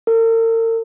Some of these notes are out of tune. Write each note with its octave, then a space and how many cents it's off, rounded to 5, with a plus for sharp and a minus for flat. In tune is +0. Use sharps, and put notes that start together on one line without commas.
A#4 -45